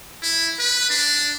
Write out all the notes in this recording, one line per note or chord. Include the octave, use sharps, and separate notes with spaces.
E4
B4
D4